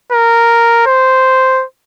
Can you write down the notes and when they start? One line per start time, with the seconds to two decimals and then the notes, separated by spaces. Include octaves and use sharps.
0.12 A#4
0.86 C5